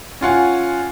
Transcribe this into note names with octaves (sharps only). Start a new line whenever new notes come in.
C#4 F4 F#5 G#5